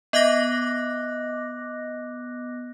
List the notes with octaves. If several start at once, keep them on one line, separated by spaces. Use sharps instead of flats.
B3 D#5 D6 F#6 A#6